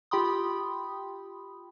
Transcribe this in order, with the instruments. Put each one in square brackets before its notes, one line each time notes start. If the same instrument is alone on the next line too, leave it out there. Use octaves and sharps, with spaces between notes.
[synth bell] F4 G4 G5 B5 C6 D#6